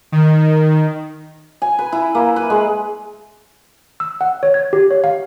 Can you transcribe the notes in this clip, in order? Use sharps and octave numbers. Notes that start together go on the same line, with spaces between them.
D#3
G#5
B4
E4
A#3
B4
G#3
E6
F#5
C#5
G#6
G4
C#5
F5